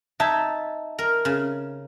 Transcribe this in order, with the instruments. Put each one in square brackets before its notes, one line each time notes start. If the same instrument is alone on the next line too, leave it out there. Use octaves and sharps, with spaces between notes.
[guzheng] D#4 [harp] E5 A5 G#6
[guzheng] A#4
C#3